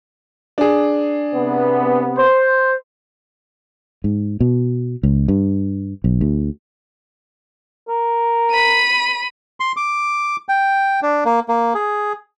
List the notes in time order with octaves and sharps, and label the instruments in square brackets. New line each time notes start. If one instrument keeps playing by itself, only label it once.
[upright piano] D4 G#4
[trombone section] C3 B3
[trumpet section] C5
[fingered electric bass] G#2
B2
C#2
G2
B1
D2
[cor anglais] A#4
[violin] B5 D#7
[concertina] C6
D6
G5
D4
A#3
A#3
G#4